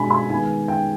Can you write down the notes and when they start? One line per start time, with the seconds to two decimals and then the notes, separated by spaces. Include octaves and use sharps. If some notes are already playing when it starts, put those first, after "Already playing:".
Already playing: B2 G#3 D4 G#5 B5
0.10 B5
0.29 D#3 G#3 B3 G#5
0.68 G5